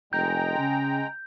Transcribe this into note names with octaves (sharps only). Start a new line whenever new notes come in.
F1 G#3 G5 A#5 G6
C#3